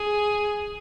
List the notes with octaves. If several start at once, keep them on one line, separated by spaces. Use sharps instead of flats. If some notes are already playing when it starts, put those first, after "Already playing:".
Already playing: G#4